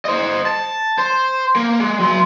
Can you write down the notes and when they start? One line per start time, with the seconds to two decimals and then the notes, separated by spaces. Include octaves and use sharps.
0.05 C5 D#5
0.46 A5
0.98 C5
1.56 A#3
1.80 G#3
2.00 F#3 C6